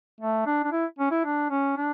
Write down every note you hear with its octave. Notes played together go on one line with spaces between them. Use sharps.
A3
D4
D4
E4
C#4
E4
D4
C#4
D4